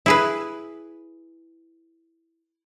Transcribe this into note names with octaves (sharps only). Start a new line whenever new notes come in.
E4 G#4 B4